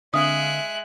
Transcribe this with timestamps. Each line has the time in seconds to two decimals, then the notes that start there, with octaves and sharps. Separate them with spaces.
0.14 D3 G#3 C4 E5 F5 D#6 F#6